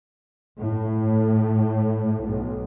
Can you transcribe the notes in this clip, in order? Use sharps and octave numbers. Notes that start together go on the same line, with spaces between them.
A2
B1